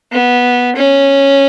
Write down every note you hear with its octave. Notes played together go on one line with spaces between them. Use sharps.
B3
C#4